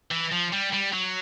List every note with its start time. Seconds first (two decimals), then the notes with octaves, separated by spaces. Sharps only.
0.11 E3
0.32 F3
0.53 G3
0.74 G3
0.94 F#3